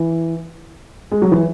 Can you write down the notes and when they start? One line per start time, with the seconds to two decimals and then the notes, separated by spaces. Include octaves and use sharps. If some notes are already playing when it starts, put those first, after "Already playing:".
Already playing: E3
1.12 G#3
1.22 F#3
1.32 E3